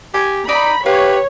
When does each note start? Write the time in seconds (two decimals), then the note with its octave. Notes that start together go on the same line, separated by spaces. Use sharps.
0.14 G4 G#5
0.49 D#4 D5 A#5 B5
0.86 G4 B4 C#5 F5